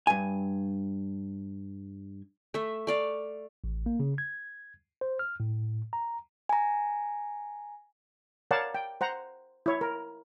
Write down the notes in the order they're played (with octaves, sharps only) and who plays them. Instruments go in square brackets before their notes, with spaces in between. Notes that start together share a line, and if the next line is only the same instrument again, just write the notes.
[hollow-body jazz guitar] G2 G#5
[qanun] A3 E5
A3 D5 F5
[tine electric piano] A1
A#3
C#3
G#6
C5
F6
A2
A#5
[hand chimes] G#5 A#5
[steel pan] A#4 C#5 D5 F5 F#5 A5
G5
C5 F#5 A#5
E4 C#5
A#4